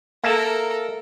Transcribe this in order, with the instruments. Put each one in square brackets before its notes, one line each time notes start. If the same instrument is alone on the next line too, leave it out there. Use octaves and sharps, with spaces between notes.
[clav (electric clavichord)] A#3 E5 A5 [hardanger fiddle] A4 A#4